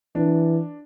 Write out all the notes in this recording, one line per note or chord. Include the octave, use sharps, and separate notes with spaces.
E3 D4